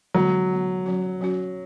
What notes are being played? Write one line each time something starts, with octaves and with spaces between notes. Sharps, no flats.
D3 F#3 G#3 B3
D3 G#3 B3
F#3 C#4 F#4
F#3 C#4 F#4